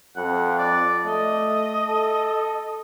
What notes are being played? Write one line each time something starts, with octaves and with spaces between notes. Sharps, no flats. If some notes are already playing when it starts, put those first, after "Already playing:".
F2 F#5
D5
A3 D#5
A4